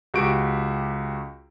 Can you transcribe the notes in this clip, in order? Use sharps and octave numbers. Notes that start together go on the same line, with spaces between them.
C#2 F#4 G4 C#6 D7